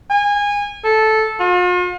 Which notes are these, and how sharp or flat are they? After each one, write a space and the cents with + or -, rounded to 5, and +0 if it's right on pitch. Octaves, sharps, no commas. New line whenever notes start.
G#5 -25
A4 -10
F4 +45